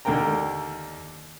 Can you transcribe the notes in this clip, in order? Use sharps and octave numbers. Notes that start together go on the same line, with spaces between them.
D#2 D3 A#4 G5 A#5